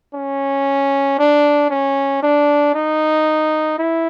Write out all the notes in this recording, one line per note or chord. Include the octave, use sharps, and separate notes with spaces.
C#4
D4
C#4
D4
D#4
E4